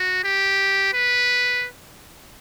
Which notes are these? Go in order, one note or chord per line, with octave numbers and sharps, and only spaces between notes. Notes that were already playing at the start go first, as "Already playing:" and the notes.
Already playing: F#4
G4
B4